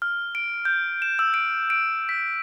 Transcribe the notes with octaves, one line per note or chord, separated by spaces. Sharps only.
F6
D7
G6
E7
E6
D7
D7
B6